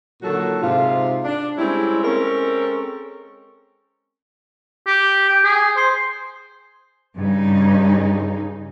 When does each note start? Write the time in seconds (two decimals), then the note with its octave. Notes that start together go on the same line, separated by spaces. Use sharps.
0.23 A#2 D3 D#3 F#3 F#4 A4
0.63 G#2 C3 F4
1.24 D4
1.58 G3 G#3 C4 C#4 E4
2.04 G#3 C4 C#4 A4 A#4
4.86 G4
5.29 G5
5.44 G#4
5.76 C5
7.17 G2 C#3 D#4